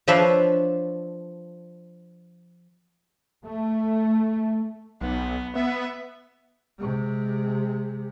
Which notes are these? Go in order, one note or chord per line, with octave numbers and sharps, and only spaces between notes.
F3 D4 B4 C#5 E5 F5
A3
B1 B3
B3 E5
C3 G#3